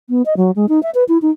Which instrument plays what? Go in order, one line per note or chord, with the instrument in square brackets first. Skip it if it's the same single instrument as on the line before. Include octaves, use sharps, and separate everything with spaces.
[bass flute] B3
D#5
F#3
G#3
D#4
E5
B4
E4
D#4